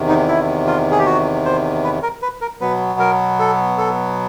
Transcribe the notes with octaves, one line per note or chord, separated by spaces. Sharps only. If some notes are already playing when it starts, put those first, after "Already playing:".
Already playing: E2 C3 D#3
D#4
E4
F4
G#4
G4
F#4
C5
B4
A#4
B4
A#4
B2 F#3 B3 B4
A#4
A4
A4